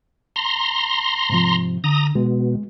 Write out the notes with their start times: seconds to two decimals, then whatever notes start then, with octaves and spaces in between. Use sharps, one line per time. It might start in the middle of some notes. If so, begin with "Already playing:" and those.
0.36 A#5 C6
1.30 G#2 C3 F3
1.84 D3 A#5 D#6
2.15 B2 G#3